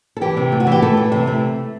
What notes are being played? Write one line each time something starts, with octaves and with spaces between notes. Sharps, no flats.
A4
E3 G4
C3
A3
F#4
E3 G4
A3 A4
E3
C3
A3